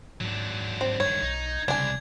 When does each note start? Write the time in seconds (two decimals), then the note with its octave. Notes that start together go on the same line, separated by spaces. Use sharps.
0.21 G#2 F#3 D4
0.81 C4
1.00 G2 D#3 C#5 G#6
1.22 B1 D#4
1.68 C2 C#3 D4 G#5 G#6